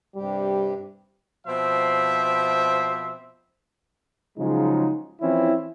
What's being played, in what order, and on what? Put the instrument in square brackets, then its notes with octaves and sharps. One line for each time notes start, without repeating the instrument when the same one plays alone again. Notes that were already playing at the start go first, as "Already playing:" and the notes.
[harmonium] G2 C3 G4 [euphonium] G3
[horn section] B2 F3 C4 C5 E5
[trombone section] C#3 F3 F#3 G#3 D#4
E3 F3 C4 C#4 E4